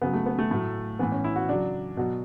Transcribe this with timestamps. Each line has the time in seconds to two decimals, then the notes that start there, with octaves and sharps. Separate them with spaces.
0.02 C#3 F#3 B3
0.13 A3
0.26 B3
0.39 A3
0.51 A2 F#3
0.99 A2 E3 B3
1.12 C#4
1.24 E4
1.36 F#4
1.48 C#3 F#3 D4
1.97 B2 F#3